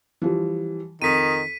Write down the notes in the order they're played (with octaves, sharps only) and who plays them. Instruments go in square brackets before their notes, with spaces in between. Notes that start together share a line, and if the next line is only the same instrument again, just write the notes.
[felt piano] E3 F3 G3
[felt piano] F2 D#6 [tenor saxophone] D#3 [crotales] B6 D#7